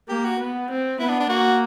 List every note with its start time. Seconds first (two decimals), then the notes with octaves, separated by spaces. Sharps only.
0.09 A#3 G4
0.24 F#4
0.39 B3
0.70 C4
0.99 B3 E4
1.09 D4
1.20 D4
1.29 A#3 F#4